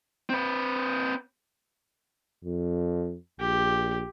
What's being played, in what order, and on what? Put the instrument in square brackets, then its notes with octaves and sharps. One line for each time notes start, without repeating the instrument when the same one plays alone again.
[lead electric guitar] C4 B4
[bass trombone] F2
[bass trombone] A#1 [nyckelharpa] G4